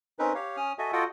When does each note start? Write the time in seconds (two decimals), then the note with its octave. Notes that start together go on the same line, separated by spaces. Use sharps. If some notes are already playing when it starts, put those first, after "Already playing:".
0.19 C4 C#4 D#4 A#4 B4
0.35 G4 C#5 F5
0.57 C#4 D#6 F6
0.78 F#4 A4 D#5 E5 G#5
0.93 F4 F#4 A4 D#5 F#5 G5